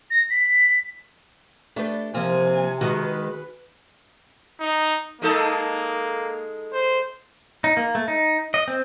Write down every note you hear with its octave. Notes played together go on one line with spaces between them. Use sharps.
A#6
B6
A3 D4 G4 B4
C3 F3 A#3 C4 G#5
D#3 G#3 F#4 G#4 B4 D#5
D#4
G#3 A#3 D#4 A4
C5
D#4
A#3
A3
D#4
D#5
C4